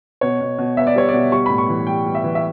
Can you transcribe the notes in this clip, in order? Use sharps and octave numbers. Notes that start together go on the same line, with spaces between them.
B2 C#5
B2
B2
B3 E5
D5
G3 C#5
B2 D5
G3 C#6
A2 B5
C#6
E3
G3 G5
G3
E5
E3
E5